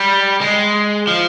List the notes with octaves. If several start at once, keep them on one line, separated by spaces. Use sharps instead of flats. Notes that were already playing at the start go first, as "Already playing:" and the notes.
Already playing: G3
G#3
F3